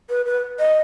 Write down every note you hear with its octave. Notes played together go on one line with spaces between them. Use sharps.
B4
B4
D#5